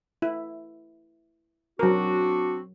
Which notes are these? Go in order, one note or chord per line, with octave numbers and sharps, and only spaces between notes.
E4
F#3 C4 D4 F#4 A#4